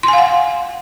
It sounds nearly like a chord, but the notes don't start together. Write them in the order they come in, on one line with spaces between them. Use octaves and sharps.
C6 G#5 F5 F#5